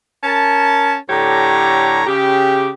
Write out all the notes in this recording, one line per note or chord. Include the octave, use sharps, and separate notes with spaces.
C#4 A#4 A5
A2 D3 G4 C#5 A#5
C#3 G4